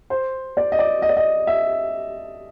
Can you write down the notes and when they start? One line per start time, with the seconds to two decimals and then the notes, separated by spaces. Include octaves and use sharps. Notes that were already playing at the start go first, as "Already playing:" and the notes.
0.10 C5
0.57 D5
0.72 D#5
0.79 D5
1.02 D#5
1.09 D5
1.17 D#5
1.47 E5